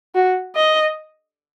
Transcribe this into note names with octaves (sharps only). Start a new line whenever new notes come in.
F#4
D#5